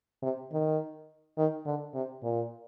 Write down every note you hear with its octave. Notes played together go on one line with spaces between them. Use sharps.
C3
D#3
D#3
D3
C3
A#2